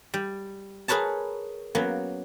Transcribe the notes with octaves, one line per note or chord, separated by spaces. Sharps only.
G3
G#4 A#4 B4 C#5 A5
F#3 A#3 B3 C#4